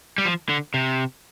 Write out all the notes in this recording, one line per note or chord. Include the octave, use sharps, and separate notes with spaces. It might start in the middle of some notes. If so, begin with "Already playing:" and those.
G3
F3
D3
C3